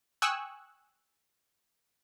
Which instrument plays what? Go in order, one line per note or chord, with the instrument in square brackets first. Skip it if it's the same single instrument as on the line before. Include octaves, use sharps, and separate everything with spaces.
[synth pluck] G5 G#5 C#6 D#6 E6 F#6